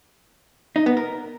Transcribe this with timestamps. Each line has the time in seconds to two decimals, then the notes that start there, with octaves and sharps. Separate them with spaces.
0.76 D#4
0.86 B3
0.97 A#4